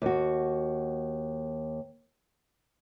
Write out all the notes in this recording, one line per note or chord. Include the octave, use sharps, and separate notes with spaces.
D#2 F#4